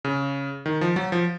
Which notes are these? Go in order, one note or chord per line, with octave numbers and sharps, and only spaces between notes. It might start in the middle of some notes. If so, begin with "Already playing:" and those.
C#3
D#3
F3
F#3
F3